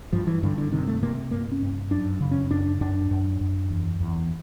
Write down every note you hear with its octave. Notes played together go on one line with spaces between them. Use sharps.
G2 F3
E3
G2 D3
D3
C3 D#3
A3
C3 A#3
G2 A#3
C#4
G2
F#2 D4
C#3
C#4
F#2 D4
F#2 D4
F#2
F#2
E2
E2